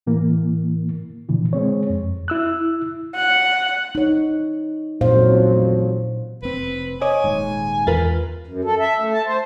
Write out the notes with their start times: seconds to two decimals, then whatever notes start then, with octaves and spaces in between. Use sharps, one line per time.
0.07 A2 E3 A#3
1.29 A#2 D3 E3 F3
1.53 G#3 C4 C#5
1.90 F2
2.28 E4 E6 F#6
3.16 F#5
3.95 D#4 C#5
5.01 A1 F2 A#2 F#3 C5 F5
6.43 F1 C4 B4
7.01 C#5 D#5 G#5 D6 D#6
7.24 D#1 D#2 G#2
7.87 E2 F4 A#4 B4 A6
8.47 F#2
8.64 A4
8.80 E5
8.99 A3
9.13 A5
9.26 C5